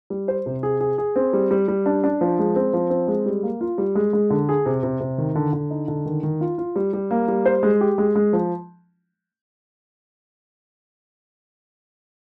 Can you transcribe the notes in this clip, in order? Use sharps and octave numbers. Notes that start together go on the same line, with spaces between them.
G3
C5
C3
G#4
G#4
G#4
C4
G3
G3
G3
D4
D4
F3
G#3
C4
F3
C4
G#3
G3
A#3
F4
G3
G#3
G#3
D3
G#4
C3
C3
C3
D#3
D3
D3
D#4
D3
D#3
D#3
F4
F4
G3
G3
A#3
G3
C5
G#3
G4
G#3
G#3
F3